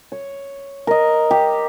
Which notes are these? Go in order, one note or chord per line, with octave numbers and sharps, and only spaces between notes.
C#5
A#4 D#5
G4